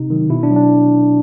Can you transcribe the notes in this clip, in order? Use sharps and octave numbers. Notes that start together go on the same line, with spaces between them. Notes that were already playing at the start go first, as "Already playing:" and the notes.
Already playing: C3 D#4
D#3 F#3
B2 E4
D4
F#3
D4